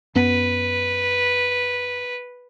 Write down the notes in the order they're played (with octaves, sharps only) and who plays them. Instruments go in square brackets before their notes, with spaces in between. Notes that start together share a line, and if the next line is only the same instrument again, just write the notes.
[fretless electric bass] F#2 B3 [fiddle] B4